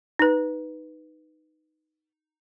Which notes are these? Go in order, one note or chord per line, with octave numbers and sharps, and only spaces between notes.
D#4 B4